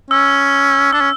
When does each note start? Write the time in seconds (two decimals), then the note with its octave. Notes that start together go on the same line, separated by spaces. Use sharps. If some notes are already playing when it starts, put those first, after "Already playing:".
0.10 C#4 E6
0.93 D4 E6
1.01 C#4